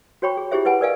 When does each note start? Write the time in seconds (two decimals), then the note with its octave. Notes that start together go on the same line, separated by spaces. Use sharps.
0.22 F#4 C5 C#5 G5 B5 C#6
0.37 G#4
0.51 E4 F4 G4 G#4 C5 E5
0.65 E4 B4 F#5 G#5 B5
0.81 A#4 B4 D5 D#5 F5 G#5